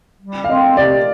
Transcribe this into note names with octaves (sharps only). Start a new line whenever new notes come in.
G3
F5
C4 D#5
C3 D5